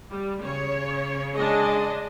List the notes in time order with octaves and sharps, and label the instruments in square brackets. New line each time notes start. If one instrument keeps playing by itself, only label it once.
[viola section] G3
[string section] C#3 [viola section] C#5
[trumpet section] G#3 G#4 [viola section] D4 D#5